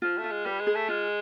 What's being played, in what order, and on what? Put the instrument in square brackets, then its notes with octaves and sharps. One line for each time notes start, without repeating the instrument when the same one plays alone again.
[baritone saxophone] F3 [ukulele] F4
[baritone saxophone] A3
[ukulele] F4
[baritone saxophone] G#3
[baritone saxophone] G3 [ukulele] B4
[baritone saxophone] G#3
[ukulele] G#4
[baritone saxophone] A3
[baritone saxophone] G#3 [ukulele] F4